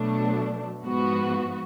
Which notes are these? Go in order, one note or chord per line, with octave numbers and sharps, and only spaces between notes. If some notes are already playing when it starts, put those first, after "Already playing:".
Already playing: B2 F#3 A3 D4
G#2 F3 B3 F#4